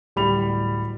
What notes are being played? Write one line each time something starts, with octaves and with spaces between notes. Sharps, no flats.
D1 G3 B5 F7